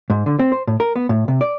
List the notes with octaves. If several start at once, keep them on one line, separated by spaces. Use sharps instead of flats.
G#2
D3
C4
C5
A2
A#4
B3
A2
C3
D5